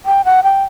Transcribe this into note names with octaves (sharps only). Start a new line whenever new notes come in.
G5
F#5
G5